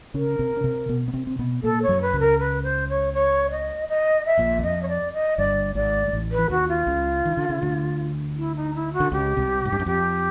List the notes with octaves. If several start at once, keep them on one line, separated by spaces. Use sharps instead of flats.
C#3 C#4 A#4
C3 C4
C#4
C3 C4
B2 B3
B3
C3 C4
C4
B2 B3
A#2 A#3 A4
C#5
F#2 F#3
B4
C#2 C#3
A#4
B4
C5
C#5
C#5
D#5
D#5
E5
A#1 A#2
E2
F2 D#5
C#5
D5
D#5
G1 G2 D5
G#1 G#2 D5
G#2
A1 A2
B4
E3
D#2 D#3 F#4
F4
C#2 C#3
D#3
D3
C#3
D2 D3
E4
D#4
E4
F#4
D3
C#2 C#3 G4
C2 C3
G#2
G2
F#2
F2 G4